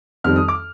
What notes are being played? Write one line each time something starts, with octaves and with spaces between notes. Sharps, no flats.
F2 D#3 G3 C4 F6
D#6
D6